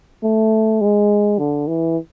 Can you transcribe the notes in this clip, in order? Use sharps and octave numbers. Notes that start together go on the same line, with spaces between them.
A3
G#3
D3
E3